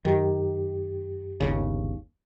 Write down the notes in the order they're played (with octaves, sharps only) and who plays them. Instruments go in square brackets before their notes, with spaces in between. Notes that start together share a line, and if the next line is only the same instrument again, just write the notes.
[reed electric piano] F#2 G4 [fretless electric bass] D#3
[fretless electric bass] G1 D#2 C#3